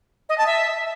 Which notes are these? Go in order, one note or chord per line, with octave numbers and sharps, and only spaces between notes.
D#5
A5
E5